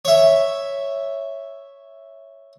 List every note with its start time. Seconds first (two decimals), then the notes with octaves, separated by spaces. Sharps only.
0.05 C#5 E5